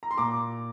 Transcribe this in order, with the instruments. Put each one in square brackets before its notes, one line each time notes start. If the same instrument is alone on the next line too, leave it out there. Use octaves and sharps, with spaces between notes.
[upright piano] A#5
C6
A#2 A#5 D6